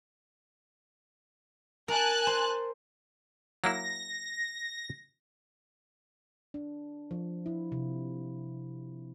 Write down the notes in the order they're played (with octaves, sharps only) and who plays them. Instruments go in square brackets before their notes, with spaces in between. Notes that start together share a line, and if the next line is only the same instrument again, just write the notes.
[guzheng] A#4 [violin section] G#5 A5 F#6
[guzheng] C5
[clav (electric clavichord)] F#3 A#3 E4 [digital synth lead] A#6
[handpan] D4
F3
E4
C3